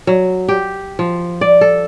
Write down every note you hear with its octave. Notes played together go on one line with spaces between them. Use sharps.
F#3
G4
F3
D5
A4